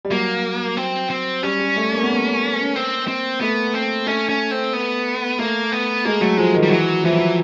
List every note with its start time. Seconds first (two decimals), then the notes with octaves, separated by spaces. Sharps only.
0.05 G3
0.11 F#3 A#3
0.77 C4
1.10 C4
1.43 G3 C#4
1.59 G3
1.76 A3
1.93 A#3
2.03 B3
2.13 A#3
2.76 C4
3.08 C4
3.41 A3 B3
3.74 C4
4.07 A3 C#4
4.29 C#4
4.51 C4
4.73 B3
5.39 A3 A#3
5.72 B3
6.05 G#3 A#3
6.21 F#3 A3
6.37 F3 G#3
6.54 D#3
6.63 G3
6.71 E3 F#3
7.04 E3 F3
7.11 F#3
7.19 F3